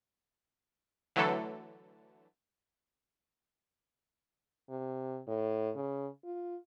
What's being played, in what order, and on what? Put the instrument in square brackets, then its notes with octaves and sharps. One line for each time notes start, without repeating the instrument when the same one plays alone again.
[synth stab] D3 E3 F#3 A3 A4
[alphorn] C3
A2
C#3
F4